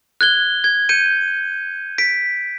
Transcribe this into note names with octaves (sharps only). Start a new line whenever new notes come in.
F#6 G#6 G7
G#6
G6 C#7 D#7
B6 D7